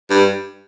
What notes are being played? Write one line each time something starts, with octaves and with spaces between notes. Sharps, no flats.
G2